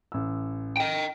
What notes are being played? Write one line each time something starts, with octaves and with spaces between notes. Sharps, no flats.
A1 E6
D#5 G5